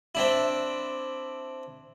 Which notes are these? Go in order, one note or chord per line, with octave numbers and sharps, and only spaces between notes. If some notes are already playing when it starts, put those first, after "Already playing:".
C4 D4 E4